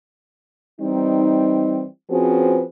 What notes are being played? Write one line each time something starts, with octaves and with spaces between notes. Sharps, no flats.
E3 G3 C4 D#4
F3 C4 C#4 F#4 G#4 B4